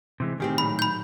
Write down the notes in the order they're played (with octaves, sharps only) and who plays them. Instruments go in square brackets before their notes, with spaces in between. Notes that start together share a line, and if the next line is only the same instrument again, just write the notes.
[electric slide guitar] C3 E3 G#3
[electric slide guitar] A2 D#3 [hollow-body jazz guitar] C4 G4 G#4
[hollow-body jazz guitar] A#2 F#3 [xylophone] B5
[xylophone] B5 G6